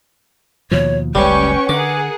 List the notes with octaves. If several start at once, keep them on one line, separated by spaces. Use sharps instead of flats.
D#2 B2 F3 C#5
F#1 C#2 G3 C#4 B4 G5 C#6
D3 G#4 A#4 F#5 D6